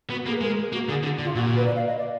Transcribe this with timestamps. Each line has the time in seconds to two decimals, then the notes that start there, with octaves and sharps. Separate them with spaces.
0.10 B3 F#4
0.26 A#3 G#4
0.35 B4
0.41 G#3 A#4
0.57 G#4
0.72 A#3 F#4
0.88 D3 G#4
1.03 D3
1.19 D3
1.24 F4
1.34 A#2 F#4
1.45 F#4
1.56 B4
1.66 D5
1.75 F5
1.86 D#5
1.97 D5